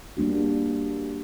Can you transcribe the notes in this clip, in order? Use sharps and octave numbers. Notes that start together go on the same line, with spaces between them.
G3 A#3 D4 F#4